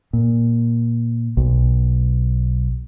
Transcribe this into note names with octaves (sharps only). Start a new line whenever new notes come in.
A#2
B1